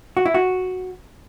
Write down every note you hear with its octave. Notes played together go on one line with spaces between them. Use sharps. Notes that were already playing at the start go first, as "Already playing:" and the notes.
F#4
E4
F#4